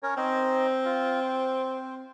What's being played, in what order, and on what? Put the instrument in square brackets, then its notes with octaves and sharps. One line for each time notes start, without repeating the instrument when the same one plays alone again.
[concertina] C#4 A#4 C#5
[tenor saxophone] C4 [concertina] D#4 C5 D#5
[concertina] F4
C5